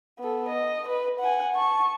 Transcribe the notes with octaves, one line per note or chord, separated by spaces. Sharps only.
B3 A4
D#5
B4
F#5 G#5
A5 C#6